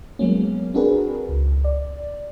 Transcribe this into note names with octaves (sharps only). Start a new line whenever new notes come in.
F#3 G#3 A#3 B3 C#4
C4 D4 F#4 G#4 A#4 B4
C#2
D5